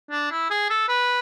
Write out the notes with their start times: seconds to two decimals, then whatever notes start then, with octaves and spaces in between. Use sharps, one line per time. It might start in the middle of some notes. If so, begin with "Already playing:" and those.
0.11 D4
0.31 E4
0.50 G#4
0.70 A4
0.88 B4